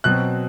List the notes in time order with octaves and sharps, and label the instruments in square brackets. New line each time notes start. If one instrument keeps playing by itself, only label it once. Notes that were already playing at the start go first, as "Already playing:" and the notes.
[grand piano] B2 F#3 C4 F#6